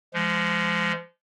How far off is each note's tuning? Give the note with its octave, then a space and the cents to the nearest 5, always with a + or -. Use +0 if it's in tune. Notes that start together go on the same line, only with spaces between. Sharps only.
F3 -30 G#3 -5